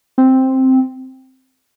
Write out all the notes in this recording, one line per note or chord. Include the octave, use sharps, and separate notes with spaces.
C4